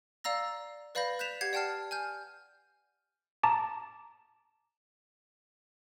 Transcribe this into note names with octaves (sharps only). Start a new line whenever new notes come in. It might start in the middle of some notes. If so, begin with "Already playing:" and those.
D5 F5 A#5 E6 A#6
B4 D5 F5 B5 G6 A#6
F#6 G6 A6 B6 E7 F7
G4 F#5 G6 G#6 C7
D5 F#5 G5 A5 F6 C7
G#5 F6 G6
A5 A#5 D6